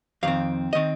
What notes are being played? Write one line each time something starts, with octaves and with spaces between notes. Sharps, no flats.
F2 D#3 C4 F5
D#3 C4 D#5